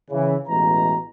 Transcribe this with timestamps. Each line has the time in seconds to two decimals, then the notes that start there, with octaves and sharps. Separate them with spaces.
0.11 C#3 E3
0.48 A1 B2 E3 G#3 A#5